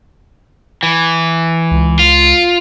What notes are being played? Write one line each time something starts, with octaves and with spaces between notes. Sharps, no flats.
E3
C#2
F4